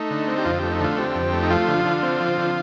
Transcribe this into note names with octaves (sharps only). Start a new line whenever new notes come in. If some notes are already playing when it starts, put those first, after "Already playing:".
Already playing: A3 D#4
D3
C4
G4
F2 F4
A3 G4
D#4
D3 F4
C4 G4
F2
A3
D#4
F3 F4
D3
D3
C4
F3
D3